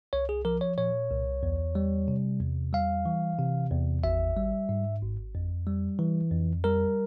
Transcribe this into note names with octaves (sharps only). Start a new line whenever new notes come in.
C2 C#5
G#4
F3 A#4
C#5
A#2 C#5
C2
E2
G3
C3
E2
G3 F5
E3
C3
E2
G#1 E5
G3
G#2
G#1
F2
G3
E3
F2
G3 A#4